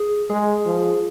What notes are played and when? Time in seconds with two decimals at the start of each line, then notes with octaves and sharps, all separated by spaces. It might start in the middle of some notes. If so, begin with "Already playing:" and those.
Already playing: G#4
0.29 G#3 G#4
0.66 F3